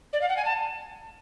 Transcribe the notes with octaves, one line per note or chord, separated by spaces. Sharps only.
D5
F5
F#5
G#5
A5